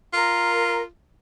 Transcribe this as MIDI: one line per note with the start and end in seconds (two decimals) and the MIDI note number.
0.13 0.86 65
0.13 0.81 70